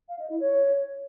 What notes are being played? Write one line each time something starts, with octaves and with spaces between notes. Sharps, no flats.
F5
D#5
E4
C#5